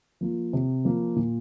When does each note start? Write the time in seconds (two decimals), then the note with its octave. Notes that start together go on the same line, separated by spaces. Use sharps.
0.21 F3 A#3 F4
0.53 C3
0.85 F3 A#3 F4
1.16 A#2